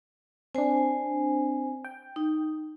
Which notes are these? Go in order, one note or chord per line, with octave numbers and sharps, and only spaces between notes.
C4 D4 C5 G#5
G5
D#4